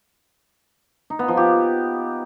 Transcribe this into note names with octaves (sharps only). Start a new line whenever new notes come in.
D#4
B3
F3
G4